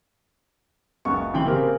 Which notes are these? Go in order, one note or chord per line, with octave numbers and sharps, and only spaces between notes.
F#1 C#2 B3 C#6
F#1 C3 E3 G5 C6 F#7
C#3 A#3 C4 G4 A#4